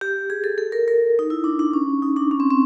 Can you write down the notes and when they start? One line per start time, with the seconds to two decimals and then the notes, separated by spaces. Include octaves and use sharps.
0.01 G4
0.30 G#4
0.44 A4
0.58 A4
0.72 A#4
0.88 A#4
1.19 D#4
1.30 E4
1.44 D4
1.59 D4
1.73 C#4
2.02 D#4
2.16 D4
2.31 C#4
2.40 C4
2.50 C4